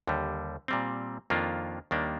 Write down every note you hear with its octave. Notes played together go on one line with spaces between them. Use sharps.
D#2 D3 G3
A#2 G3 C4
F2 D#3 A#3 D4 F4
D#2 D#3 G3 A#3 D4